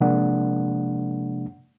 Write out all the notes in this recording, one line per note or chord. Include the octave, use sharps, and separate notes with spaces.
C3 F3 G#3 A#3 D4 F#5